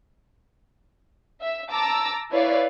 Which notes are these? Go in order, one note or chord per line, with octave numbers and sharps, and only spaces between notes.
E5
A5 A#5 D6 E6
E4 B4 C#5 D5 F5